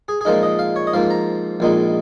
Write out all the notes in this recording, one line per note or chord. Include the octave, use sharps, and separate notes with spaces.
G#4
G#4
A#2 F3 G#3 D#4 A#4
D#5
F5
C#5
D#5
G#2 F3 A#3 F5
A#5
A#1 A#2 G#3 D#4